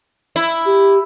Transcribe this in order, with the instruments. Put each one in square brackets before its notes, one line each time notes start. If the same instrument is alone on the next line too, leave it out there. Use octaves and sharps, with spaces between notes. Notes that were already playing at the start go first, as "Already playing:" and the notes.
[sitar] E4
[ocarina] G4